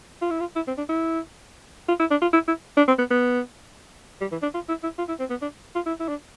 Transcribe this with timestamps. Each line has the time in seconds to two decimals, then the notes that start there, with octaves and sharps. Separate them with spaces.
0.22 F4
0.31 E4
0.40 F4
0.56 E4
0.68 C4
0.78 D4
0.89 E4
1.88 F4
2.00 E4
2.11 D4
2.22 F4
2.33 E4
2.48 E4
2.77 D4
2.88 C4
2.98 B3
3.10 B3
4.21 G3
4.32 E3
4.42 D4
4.54 F4
4.69 E4
4.83 E4
4.98 F4
5.09 E4
5.20 C4
5.30 B3
5.42 D4
5.75 F4
5.86 E4
6.00 E4
6.08 D4